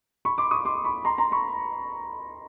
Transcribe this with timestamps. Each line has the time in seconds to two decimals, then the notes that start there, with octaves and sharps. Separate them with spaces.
0.25 B5 C#6
0.38 C6 D6
0.51 C#6 D#6
0.65 C6 D6
0.84 B5 C#6
1.05 A#5 C6
1.18 A#5 C6
1.32 B5 C#6